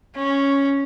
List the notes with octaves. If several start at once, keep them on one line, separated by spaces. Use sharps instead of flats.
C#4